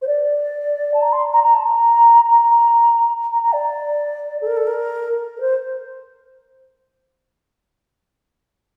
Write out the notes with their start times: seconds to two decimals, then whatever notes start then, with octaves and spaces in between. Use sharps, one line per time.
0.02 C5
0.07 D5
0.94 A5
1.02 A#5
1.13 C6
1.33 A#5
1.44 A#5
1.54 A5
1.64 A#5
2.27 A#5
3.32 A#5
3.42 A#5
3.53 D5
4.42 A4
4.47 A#4
4.57 A4
4.67 A#4
5.36 A#4
5.41 C5